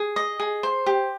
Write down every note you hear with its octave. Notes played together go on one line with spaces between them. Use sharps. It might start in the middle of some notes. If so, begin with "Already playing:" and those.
Already playing: G#4
D#5
G#4
C5
G4